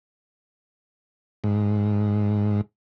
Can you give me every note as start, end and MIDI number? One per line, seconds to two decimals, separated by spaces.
1.44 2.61 44